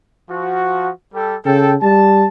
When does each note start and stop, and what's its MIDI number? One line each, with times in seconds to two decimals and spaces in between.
0.30 0.90 53
0.30 0.90 66
1.14 1.36 55
1.14 1.36 67
1.14 1.36 69
1.45 1.76 49
1.45 1.74 69
1.45 1.74 79
1.82 2.27 55
1.82 2.28 81